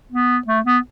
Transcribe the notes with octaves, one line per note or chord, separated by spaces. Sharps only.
B3
A3
B3